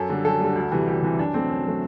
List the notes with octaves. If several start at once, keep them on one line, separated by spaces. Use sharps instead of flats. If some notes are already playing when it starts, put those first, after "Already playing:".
Already playing: F#2 A4
D3 G3
F#2 A4
D3 G3
D2
C3 E3 G3
D2 G4
C3 E3 G3
F#2 D4
F#3 A3 C4
F#2
F#3 A3